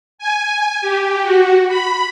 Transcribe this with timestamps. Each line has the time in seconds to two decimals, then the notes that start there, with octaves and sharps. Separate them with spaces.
0.19 G#5
0.81 G4
1.23 F#4
1.68 B5